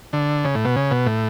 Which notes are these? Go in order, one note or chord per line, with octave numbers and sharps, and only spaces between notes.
D3
C#3
A2
B2
C#3
B2
A2